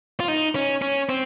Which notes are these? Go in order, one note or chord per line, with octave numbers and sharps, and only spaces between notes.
F4
D#4
C#4
C#4
C4